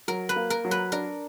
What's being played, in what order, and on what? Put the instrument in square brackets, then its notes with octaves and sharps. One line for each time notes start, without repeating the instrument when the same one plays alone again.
[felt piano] F#3 [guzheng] A#4
[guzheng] B4
[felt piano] A#3
[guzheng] A#4
[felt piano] F#3
[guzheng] B4
[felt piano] D4 [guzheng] A#4